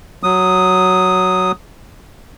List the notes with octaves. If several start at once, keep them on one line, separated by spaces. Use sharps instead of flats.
F#3 D#6